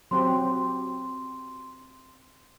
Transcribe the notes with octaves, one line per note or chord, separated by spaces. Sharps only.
F#3 C4 G4 C6